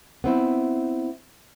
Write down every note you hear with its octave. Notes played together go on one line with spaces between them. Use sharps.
B3 C4 E4